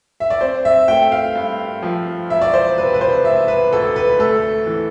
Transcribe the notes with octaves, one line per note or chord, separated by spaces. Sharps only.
E5
D5
C4 C5
E5
A3 G5
F5
G2
F3
E1 E5
D5
C5
C3 B4
B4
C5
E1 E5
B4
D2 A4
B4
A3 A4
E3